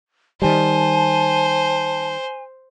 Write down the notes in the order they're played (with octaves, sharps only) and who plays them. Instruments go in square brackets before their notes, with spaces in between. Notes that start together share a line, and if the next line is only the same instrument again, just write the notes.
[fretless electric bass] D#3 G3 [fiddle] C5 [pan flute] G#5 [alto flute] A5